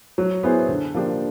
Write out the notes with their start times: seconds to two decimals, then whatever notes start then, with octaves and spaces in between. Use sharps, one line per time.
0.18 F#3
0.43 B3 E4 G#4 C5
0.68 D3
0.94 F3 A#3 D4 G4